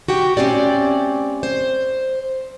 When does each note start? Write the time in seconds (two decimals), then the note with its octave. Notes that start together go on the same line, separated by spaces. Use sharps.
0.08 F#4 G4 G5
0.37 A3 C4 C#4 G4 D5
1.43 C5